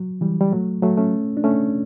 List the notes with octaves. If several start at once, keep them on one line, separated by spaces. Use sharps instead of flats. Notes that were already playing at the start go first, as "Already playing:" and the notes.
Already playing: F#3
E3 G3
G3
F#3 A3
F#3 A3
A3 C#4
D4
A3 C#4